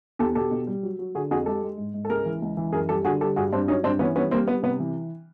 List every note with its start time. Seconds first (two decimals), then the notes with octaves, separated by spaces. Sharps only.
0.19 E2 G4 A4
0.35 B2 G4 A4
0.51 B2
0.67 G3
0.83 F#3
0.99 F#3
1.15 D3 F#4 G#4
1.31 F2 F#4 G#4
1.46 G#3 G4 A4
1.63 G#3
1.78 G#2
1.94 G#2
2.05 A4
2.09 C#2 G#4 A#4
2.25 E3
2.42 C#2
2.57 E3
2.73 F#2 G#4 A#4
2.89 G3 G4 A4
3.05 D3 F#4 G#4
3.20 G3 G4 A4
3.36 G2 F#4 G#4
3.53 G2 C4 D4
3.68 F#3 C#4 D#4
3.83 G2 C4 D4
3.99 E3 B3 C#4
4.15 G3 B3 C#4
4.31 G3 A#3 C4
4.48 G3 B3
4.63 C3 B3
4.80 E3